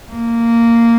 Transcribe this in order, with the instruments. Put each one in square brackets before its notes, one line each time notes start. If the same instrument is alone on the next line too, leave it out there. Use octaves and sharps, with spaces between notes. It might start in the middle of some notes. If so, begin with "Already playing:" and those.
[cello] A#3